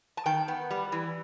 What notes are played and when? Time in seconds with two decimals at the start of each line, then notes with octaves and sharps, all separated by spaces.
0.17 A5
0.26 D#3 G5
0.48 B3
0.70 G3
0.92 E3